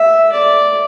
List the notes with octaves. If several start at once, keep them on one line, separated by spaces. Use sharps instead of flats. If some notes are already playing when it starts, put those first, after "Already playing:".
Already playing: E5
D5